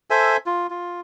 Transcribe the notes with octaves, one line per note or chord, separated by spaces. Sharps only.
A4 C5 E5 G#5
F4
F4